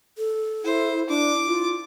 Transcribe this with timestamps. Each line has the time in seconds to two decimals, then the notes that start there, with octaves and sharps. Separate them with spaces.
0.18 A4
0.64 E4 C5
1.09 D4 E4 D6
1.46 F4